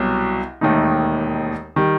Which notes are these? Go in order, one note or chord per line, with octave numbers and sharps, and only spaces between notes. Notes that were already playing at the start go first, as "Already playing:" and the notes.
Already playing: C2 B2 F#3
E1 D#2 D#3 A3 D#4
D#3 G3